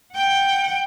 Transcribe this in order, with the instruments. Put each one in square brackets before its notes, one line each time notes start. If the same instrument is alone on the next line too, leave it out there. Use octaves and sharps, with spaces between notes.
[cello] F#5 G5